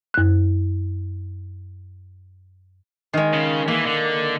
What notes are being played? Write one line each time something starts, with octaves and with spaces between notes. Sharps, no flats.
F#2 F#6
D#3 G#3
C#3
E3 A#3
D3